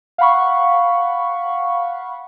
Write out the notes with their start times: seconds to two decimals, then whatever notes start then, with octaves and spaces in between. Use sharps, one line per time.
0.18 F5 F#5 B5 C#6